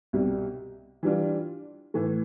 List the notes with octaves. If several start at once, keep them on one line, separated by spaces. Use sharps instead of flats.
C2 B2 G3
E3 G3 D4 F4
A2 E3 A3